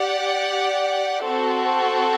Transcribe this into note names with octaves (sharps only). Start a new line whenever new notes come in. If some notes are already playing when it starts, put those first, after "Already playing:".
Already playing: G4 D5 F#5
C4 F#4 A4